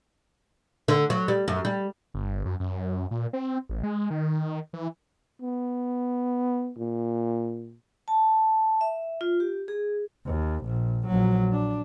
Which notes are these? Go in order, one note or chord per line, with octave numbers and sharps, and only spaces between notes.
D3
F#3
G3
F#2
G3
G1
F#2
F#2
A#2
C4
A1
G#3
D#3
E3
B3
A#2
A5
E5
F4
G4
G#4
D#2
A#1
A#1 F#3
D4